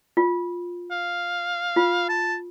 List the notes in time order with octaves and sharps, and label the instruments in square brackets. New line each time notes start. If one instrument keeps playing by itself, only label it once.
[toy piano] F4
[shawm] F5
[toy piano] F4
[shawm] A5